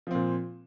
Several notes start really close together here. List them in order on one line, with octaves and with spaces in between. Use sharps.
F3 C4 A#2